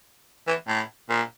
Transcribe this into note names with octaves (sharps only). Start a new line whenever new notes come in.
E3
A2
A#2